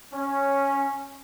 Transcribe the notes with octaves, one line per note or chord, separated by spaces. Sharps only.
C#4